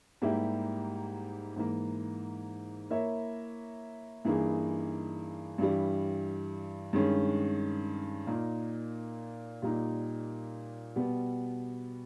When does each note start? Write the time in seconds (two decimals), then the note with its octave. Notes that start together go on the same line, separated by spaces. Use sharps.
0.22 G#2 G3 A#3 E4 G4
1.56 G#2 E3 A#3
2.90 A#3 E4 A#4 C#5 E5
4.25 G2 E3 A#3 D#4 G#4
5.58 G2 E3 G3
6.93 G2 D#3 G#3 C#4
8.27 A#2 A#3 D#4
9.62 A#2 G3 A#3 D#4
10.96 B2 G3 B3